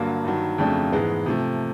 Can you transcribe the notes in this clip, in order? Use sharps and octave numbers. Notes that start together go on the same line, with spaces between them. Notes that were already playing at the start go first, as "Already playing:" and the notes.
Already playing: G2 D3 F#3 A#3
G2 D#3 F#3
F2 C#3 F#3 A3 D4
G#2 E3 G#3 B3
C3 F3 A3